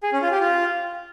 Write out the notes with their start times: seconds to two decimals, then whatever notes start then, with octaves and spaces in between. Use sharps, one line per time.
0.03 G#4
0.12 C#4
0.22 F4
0.31 G4
0.41 F4